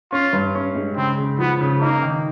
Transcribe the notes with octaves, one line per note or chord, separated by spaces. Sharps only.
C#4 F4
G2
C#4
G#3
C#3 C4
C#3
F3 B3
C#3
A#3 D#4
D#3